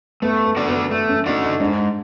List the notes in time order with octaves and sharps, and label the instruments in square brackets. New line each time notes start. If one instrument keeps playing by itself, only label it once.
[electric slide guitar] A3 [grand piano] B3
[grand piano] B3
[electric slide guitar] D4 F#4 A4 D5
[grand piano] B3
[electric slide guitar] A3 [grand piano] B3
[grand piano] C#4
[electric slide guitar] D4 F#4 A4 D5 [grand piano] D#4
[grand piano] D#4
[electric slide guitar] G#2 [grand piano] D4